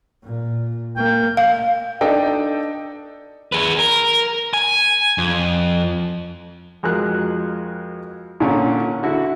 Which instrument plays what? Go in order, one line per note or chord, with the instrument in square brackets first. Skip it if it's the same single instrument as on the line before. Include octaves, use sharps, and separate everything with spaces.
[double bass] A#2
[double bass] A#3 [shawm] G5
[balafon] F5
[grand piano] D4 D#4 A4 D#5 G5
[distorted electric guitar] G#4 B4
A#4
G#5
F2
[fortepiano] F2 G#3 F#4 A#4 F#6
A#2 D3 C#4
D3 E4 F#4